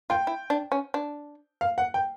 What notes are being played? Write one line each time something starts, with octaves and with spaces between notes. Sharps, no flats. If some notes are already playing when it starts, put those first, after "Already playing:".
F4 G5
E4
D4
C#4
D4
F5
F#5
G5